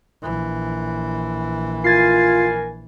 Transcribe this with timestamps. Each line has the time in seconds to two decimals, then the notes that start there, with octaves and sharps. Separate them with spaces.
0.23 A#1 E3
1.84 F4 A#4 G#5 G#6 A6 C7